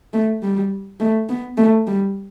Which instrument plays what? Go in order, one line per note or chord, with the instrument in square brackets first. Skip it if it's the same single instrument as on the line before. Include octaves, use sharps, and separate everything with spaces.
[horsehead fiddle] A3
G3
A3
B3
A3
G3